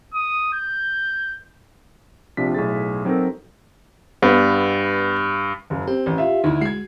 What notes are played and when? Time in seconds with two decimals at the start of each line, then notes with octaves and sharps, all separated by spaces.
0.14 D#6
0.53 G6
2.37 A#1 C3 D4 F4 B6
2.54 B1 A2 G#4 A6
3.05 F#3 C4 D#4 A4 A#4
4.22 G2 B3
5.70 F#1 F#3
5.87 C4 G4
6.06 A1
6.18 F4 E5
6.44 D2 D#4 E4
6.61 G#3 F#4 G#6 C7